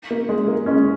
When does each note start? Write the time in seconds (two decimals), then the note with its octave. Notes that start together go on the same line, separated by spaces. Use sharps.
0.11 A#3
0.29 G#3
0.48 A#3
0.66 G#3 C#4